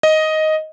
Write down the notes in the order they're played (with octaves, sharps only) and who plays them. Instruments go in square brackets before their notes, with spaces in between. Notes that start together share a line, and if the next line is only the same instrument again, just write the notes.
[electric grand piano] D#5